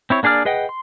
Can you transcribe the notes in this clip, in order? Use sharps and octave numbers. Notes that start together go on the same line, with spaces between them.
C4 E4 C#5
A#3 D4 G#4 D5 F6
G#4 B4 D#5 F#5 G5
C6